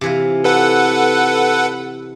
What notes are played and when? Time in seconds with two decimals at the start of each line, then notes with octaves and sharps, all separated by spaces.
0.01 C3 E3 F4
0.44 A4 B4 F#5